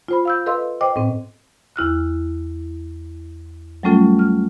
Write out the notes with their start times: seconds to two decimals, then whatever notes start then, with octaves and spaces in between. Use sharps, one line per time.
0.08 F4 C5 B5
0.25 F5 E6 G6
0.46 A4 B4 D#5 F5 C6 E6
0.81 C5 D#5 G5 D6
0.96 A2 C4
1.76 E2 E4 F6 F#6
3.83 F#3 G3 A3 C#4 F4 A4
4.19 F6